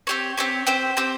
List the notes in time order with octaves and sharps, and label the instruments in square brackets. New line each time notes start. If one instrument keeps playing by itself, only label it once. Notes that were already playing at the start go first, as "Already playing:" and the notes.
[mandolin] C4 G4 C#5
C4 G4 C#5
C4 G4 C5
C4 G4 C5